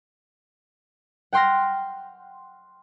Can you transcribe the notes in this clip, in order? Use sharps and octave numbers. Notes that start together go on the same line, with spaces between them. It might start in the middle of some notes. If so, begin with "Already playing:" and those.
F#5 G5 C6 F6 A#6